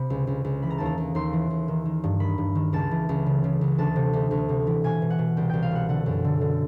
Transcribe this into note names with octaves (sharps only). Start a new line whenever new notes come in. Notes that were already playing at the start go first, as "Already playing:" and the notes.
Already playing: C3 B5
C#2
C#2
C#2
E3 B5
A#5
D#2 A5
A#5
D#2
D#2 C6
E3
D#2
D#3
D#3
G2
D#3 B5
G2
D#3
C#2 A5
E3
C#2
C#3
C#3
C#2
D2 A5
C3
D2
D2
C3
E3
B2 G#5
B2
F#5
B2
C2 G5
C2 G5
F5
B2 F#5
D3 F#5
F#2
D3
D3